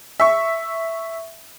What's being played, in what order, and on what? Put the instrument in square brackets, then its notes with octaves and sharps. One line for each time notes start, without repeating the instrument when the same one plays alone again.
[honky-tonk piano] E5 C#6